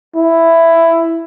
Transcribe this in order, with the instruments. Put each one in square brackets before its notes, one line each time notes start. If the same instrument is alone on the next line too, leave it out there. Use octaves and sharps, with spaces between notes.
[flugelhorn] E4